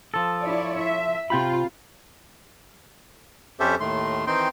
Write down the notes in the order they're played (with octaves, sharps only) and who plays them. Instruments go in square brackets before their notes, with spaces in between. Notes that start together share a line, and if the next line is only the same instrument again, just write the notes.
[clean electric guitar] F3 A4
[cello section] E4 C#5 D5
E5
[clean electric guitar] C3 G5 B5 [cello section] F4
[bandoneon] F2 C#4 G4 A4 C5 E5
D#2 A2 D#3 A3 C6
D#3 E3 C4 D#4 G5 C6